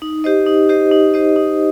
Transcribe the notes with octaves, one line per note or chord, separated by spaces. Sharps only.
D#4
G4 C5 D#5
D#4
G4 C5 D#5
D#4
G4 C5 D#5
D#4